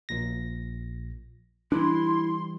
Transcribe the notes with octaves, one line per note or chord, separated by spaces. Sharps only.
A#1 A#2 A#6
E3 G3 D4 E4 C6